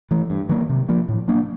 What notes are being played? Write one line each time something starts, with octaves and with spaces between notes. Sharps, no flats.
E3 A3
G2
D#3 F#3 A#3
C3
F3 A#3
A2
F#3 A#3 D4